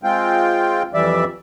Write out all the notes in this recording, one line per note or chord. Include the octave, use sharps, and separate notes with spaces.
G#3 C4 F4 G5
F2 E3 G3 D5 E5